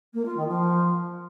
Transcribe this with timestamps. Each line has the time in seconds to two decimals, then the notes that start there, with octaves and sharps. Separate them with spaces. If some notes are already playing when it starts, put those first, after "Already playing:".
0.13 A#3
0.25 F4
0.36 D#3
0.48 F3